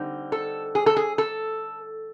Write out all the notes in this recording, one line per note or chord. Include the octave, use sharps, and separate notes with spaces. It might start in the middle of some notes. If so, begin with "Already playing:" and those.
Already playing: D3 G3 C4 D#4
A4
G#4
A4
G#4
A4